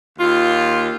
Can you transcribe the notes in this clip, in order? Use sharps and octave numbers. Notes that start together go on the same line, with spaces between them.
D#2 F4